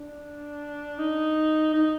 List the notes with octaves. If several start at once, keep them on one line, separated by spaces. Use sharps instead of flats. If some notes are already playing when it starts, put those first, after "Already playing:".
Already playing: D4
D#4
D#4